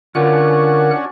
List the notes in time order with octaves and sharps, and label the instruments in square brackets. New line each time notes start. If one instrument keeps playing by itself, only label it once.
[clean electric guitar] D3 F4 [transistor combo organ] C#4 D4 F#4 [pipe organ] A#4 F#5 F#6